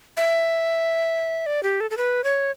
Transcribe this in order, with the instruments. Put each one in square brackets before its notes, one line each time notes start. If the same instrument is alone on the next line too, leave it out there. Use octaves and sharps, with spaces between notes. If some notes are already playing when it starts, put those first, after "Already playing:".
[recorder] E5
D5
G4
A4
A4
B4
C#5